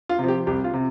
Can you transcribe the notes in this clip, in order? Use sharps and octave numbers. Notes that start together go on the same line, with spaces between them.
F4
C3 F3
G4
C2 G4
F4
C3